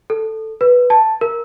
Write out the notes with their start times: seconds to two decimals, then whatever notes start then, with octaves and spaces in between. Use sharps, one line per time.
0.10 A4
0.61 B4
0.90 A5
1.21 A#4